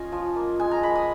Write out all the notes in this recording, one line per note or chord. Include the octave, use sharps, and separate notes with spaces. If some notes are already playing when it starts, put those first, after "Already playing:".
Already playing: C#4 F4 D#5 G#5
F3
A#3
G#3 G#5
A#5
G#3 B5
D#6